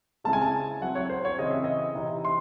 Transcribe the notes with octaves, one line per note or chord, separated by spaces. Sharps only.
C#3 G#3 C4 E4 A5
G#5
A5
F#3 C4 E4 F#5
C#5
C5
C#5
C#3 E3 C4 D#5
E5
D#5
C3 E3 C4 D#4
C6